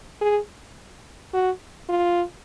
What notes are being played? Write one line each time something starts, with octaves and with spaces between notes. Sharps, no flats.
G#4
F#4
F4